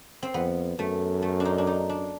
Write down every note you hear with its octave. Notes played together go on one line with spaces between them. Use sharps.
C4
F2 B3
F#2 A3
A3
D4
D#4
D4
D#4
D4